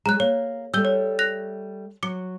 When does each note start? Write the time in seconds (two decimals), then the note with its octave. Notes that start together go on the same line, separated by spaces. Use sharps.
0.06 F#3 G#3 A#5 F#6
0.20 A#3 C#5
0.74 G3 A3 E6 G6 G7
0.85 C#5
1.19 F#6 A#6 F7
2.03 F#3 D6 C#7